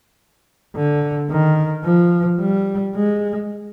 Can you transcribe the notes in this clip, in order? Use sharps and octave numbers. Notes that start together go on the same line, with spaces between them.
D3
D#3
F3
G3
G#3